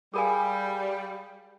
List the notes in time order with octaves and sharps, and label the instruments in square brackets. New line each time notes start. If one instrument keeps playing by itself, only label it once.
[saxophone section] G3 [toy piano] G#4 A#4 G#5 [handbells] F5 B5 D#6